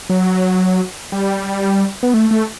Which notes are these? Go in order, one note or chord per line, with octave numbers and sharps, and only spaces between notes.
F#3
G3
B3
A3
A3